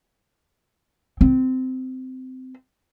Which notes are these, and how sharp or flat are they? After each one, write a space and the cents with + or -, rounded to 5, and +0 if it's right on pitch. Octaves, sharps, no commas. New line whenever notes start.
C4 -20